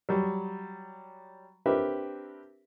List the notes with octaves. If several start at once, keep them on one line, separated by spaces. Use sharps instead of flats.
F#3 G3
C4 D4 G4 A#4 B4 E5